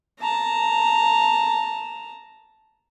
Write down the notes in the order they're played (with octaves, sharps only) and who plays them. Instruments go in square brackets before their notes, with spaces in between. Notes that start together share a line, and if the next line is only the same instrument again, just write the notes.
[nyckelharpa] A5 A#5